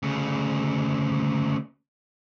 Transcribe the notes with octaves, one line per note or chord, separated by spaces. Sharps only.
D2 C#3